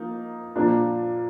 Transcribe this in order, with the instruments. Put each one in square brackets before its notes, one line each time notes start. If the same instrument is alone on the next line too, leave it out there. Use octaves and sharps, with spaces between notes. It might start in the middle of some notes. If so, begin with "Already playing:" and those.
Already playing: [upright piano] F3 A#3 D#4
A#2 F3 A#3 D4